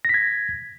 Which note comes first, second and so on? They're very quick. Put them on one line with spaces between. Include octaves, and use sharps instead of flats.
A#6 B6 G#6